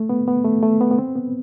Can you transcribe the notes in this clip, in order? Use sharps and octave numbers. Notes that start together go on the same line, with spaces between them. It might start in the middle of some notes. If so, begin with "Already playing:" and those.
Already playing: A3
B3
B3
A3
A3
B3
B3
C4
B3